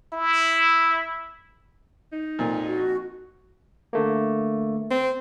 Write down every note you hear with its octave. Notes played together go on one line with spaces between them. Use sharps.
E4
D#4
F2 A#2
F#4
D3 A3 A#3
C4